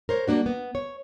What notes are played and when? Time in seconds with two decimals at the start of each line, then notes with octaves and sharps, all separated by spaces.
0.09 A#4 C5 C#5
0.28 G3 A#3 D4 F#4
0.46 B3
0.75 C#5